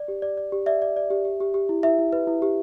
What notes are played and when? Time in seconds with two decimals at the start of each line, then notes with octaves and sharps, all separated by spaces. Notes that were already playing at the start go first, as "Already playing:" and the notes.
Already playing: D5
0.08 G4
0.22 D5
0.37 D5
0.52 G4
0.66 D5 E5
0.82 D5
0.96 D5
1.10 G4
1.25 G4
1.40 G4
1.54 G4
1.69 E4
1.83 E4 E5
1.99 E4
2.13 B4
2.27 E4
2.42 G4